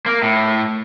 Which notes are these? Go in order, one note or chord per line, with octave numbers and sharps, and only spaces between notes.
A#3
A2